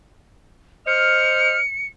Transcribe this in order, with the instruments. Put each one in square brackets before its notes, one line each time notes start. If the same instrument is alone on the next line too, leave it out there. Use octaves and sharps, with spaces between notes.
[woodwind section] C5 D#5 F6 [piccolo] C#7